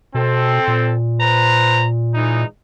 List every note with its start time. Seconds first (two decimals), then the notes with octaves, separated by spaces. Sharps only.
0.15 B2 C4 A4
0.68 A#2
1.20 B4 C5 A#5
2.14 E3 G#3 D#4